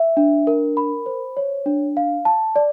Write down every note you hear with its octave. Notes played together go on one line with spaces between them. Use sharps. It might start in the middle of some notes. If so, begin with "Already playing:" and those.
Already playing: E5
D4
A#4
B5
C5
C#5
D4
F5
A5
D5